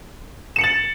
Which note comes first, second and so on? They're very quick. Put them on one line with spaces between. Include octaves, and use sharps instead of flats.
E7 C#7 F#7 A6